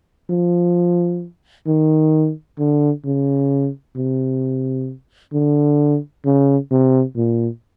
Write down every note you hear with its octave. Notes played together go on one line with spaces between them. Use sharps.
F3
D#3
D3
C#3
C3
D3
C#3
C3
A#2